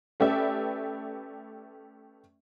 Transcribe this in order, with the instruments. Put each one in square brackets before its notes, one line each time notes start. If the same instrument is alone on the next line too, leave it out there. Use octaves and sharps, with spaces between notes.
[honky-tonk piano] A3 C#4 G4 B4 D5 E5